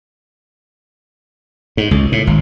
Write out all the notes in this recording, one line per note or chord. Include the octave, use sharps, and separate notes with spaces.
G#2
C#2
A2
G#1